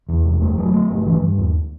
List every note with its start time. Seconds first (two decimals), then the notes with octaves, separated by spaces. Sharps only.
0.09 E2
0.25 F#1
0.41 A3
0.58 F#3
0.74 A3
0.90 G1
1.07 E3
1.22 G2
1.38 D#2